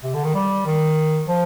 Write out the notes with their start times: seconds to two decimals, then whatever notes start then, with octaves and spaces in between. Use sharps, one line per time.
0.04 C3
0.14 D3
0.24 D#3
0.35 G3
0.66 D#3
1.28 F3